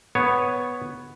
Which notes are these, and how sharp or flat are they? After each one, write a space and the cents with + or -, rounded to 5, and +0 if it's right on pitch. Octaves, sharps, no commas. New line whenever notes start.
B3 +0 C#5 +0